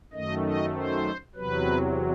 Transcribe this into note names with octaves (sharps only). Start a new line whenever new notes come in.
F#2 D#3 A3 D#5
D#5
C5
E2 C3 F#3 B4